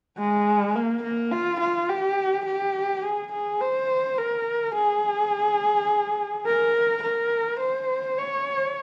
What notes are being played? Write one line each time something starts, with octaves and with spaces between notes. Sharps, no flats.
G#3
A#3
A#3
F4
F4
G4
G4
G#4
G#4
C5
A#4
G#4
A#4
A#4
C5
C#5